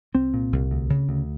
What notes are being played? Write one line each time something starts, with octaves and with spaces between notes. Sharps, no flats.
C2 C4
A#2
C2
D2
C#3
D2